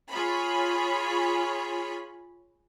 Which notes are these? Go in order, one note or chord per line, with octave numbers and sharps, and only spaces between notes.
F4 G#4 C#5 B5